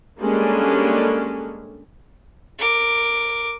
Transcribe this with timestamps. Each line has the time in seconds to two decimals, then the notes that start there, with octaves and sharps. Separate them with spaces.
0.18 G3 G#3 A#3 C#4 D4 A4
2.59 A#4 D6